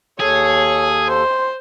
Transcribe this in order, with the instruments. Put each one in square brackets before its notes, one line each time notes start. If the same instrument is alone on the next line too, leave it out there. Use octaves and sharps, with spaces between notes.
[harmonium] D#2 A4 [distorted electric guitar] G#4 [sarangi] C#5
[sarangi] C5